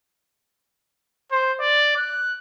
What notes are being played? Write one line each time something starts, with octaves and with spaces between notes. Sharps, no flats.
C5
D5
F#6